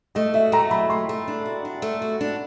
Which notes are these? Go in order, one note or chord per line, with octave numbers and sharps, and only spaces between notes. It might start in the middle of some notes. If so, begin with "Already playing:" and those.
A3 D#5
F#4 E5
A3 A#5
F#3 B5
A3 C6
A3
D4
F#4
D4
A3
F#4
D4